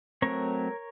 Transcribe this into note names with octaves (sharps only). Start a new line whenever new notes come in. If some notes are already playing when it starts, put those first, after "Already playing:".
F#3 A3 C4 A#4 C#5